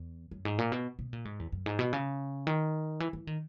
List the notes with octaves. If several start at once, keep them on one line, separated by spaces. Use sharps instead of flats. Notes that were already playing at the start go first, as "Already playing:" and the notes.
Already playing: E2
F#2
G#2
A#2
B2
B2
A#2
G#2
E2
F#2
G#2
B2
C#3
D#3
E3
E3
D#3